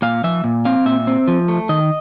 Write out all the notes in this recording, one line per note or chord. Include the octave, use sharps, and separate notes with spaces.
A#2 F5
F3 E5
A#2
C4 F5
A#2 E5
C4
F3
A3
D#3 D#5